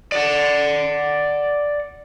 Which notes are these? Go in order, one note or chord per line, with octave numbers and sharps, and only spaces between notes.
D5 F#5